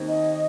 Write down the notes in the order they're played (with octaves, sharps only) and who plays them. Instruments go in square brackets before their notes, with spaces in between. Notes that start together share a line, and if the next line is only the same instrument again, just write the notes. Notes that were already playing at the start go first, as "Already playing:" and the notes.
Already playing: [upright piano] D#2 D#3 C4 D#4
[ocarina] D#5